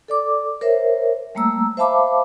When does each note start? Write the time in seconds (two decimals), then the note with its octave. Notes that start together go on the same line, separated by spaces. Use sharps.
0.08 A4 D5 D6
0.61 A#4 C5 C#5 E5
1.35 G3 A3 A#3 A#5 E6
1.77 C5 E5 F5 A5 B5 D6